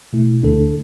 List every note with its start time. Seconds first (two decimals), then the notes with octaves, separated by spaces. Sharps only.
0.13 B2 A3 E4
0.43 D2 D3 A3 D4 A4